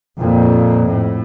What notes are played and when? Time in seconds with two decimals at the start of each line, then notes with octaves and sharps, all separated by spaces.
0.19 F2 A#2
0.89 A2